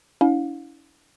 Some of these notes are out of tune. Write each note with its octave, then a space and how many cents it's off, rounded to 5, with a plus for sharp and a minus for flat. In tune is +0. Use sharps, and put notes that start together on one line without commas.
C#4 +40 E4 -20 F5 +35